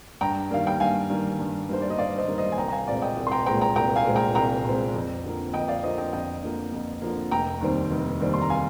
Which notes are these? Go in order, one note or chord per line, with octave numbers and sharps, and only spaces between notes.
G2 G5 A#5
D#3 G3 A#3 F5
G5
G2 F5 G#5
D#3 G3 A#3
G2
D#3 G3 A#3 C5
D5
D#5
G2 D5 F5
C5 D#5
D#3 G3 A#3
C5 D#5
G#5
C2 G5 A#5
A#5
F5 G#5
A#2 G#3 C4 D5 F5
D#5 G5
C2
C6
G5 A#5
A#2 G#3 C4 G5 A#5
G5 A#5
C2 G5 A#5
F5 G#5
A#2 G#3 C4
G5 A#5
C2 G5 A#5
A#2 G#3 C4
F2
D3 F3 A#3
F2 D#5 G5
D5 F5
D3 F3 A#3 C5 D#5
D#5 G5
F2 D#5 G5
D3 F3 A#3
F2
D3 F3 A#3
F1 G5 A#5
D#2 D#3 G3 C4
F1
D#2 D#3 G3 C4
C6
A#5
F5 G#5